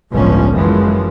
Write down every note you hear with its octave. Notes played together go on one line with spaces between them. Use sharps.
G1 C#2 A2 F3 C#4
F#2 E3 F3 G#3